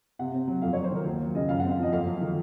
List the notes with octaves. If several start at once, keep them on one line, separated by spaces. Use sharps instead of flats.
C3 F#5
C4
F#3
F2 F5
F#3 C#5
C5
D#3 A#4
D#2 F#4
F#3
C#3 D#5
F#2 F5
C4 F#5
F5
F3 D#5
F2 F5
F#3
D#3